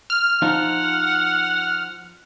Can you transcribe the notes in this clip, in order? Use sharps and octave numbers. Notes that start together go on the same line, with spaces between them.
F6
F3 D#4 F4 F#5